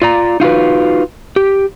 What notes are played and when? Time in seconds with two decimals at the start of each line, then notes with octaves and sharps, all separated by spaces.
0.02 F4 D5 A#5
0.40 D#4 F4 F#4 B4
1.36 G4